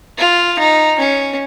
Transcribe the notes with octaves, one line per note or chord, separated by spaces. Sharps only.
F4
D#4
C#4